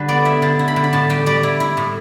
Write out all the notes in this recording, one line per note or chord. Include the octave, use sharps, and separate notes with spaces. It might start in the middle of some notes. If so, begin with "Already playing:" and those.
Already playing: D3 G3 B4
B3 D5
E4 E5
D3 A5
E4
B5
D3
B5
A2 A5
G3 G5
G3 D5
E4
E4
A2